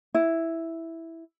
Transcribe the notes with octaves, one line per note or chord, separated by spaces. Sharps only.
E4